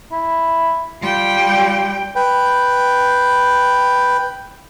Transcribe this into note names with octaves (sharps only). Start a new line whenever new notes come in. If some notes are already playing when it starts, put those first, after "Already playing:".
E4
G3 F4 G5
B4 G5